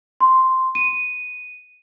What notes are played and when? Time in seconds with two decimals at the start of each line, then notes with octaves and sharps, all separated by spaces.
0.21 C6
0.75 D#7